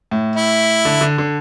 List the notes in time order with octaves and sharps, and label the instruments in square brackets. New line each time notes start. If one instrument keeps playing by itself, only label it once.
[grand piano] A2
[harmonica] E4
[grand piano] D3
D3
D3